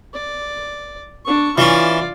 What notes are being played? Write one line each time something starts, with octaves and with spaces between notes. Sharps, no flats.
D5
D4 C#6
E3 C#4 F4 D5